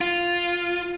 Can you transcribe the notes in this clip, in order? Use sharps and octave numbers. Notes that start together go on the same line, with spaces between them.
F4